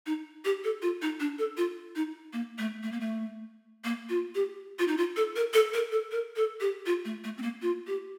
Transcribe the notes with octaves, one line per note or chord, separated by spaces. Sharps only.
D#4
G4
A4
F4
D#4
D4
A4
F4
D#4
A#3
A3
A3
A#3
A3
A#3
F4
G4
F4
D#4
F4
A4
A#4
A4
A#4
A4
A#4
A4
G4
F4
A3
A3
C4
A#3
F4
G4